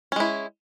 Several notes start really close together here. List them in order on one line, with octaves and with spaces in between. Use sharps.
C#4 G#3 E4